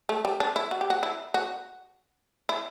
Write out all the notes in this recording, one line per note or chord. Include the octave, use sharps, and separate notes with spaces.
A3
G3
D4
E4
F#4
G4
F#4
E4
F#4
E4